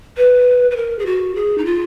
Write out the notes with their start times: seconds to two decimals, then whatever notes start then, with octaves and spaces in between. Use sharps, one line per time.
0.17 B4
0.71 B4
0.76 A#4
0.99 G#4
1.06 F#4
1.35 G#4
1.58 D#4
1.65 F4